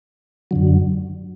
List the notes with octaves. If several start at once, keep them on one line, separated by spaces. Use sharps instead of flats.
F#2 D3 F#3